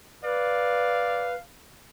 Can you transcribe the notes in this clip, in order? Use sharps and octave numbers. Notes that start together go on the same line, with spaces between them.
B4 D5 F5